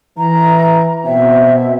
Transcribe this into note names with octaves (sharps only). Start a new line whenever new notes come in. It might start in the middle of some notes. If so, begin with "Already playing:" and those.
E3 A#5
B2 C4 E5